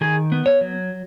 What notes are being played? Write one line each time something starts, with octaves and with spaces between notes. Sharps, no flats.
D#3 G#4
B3
C#5
F#3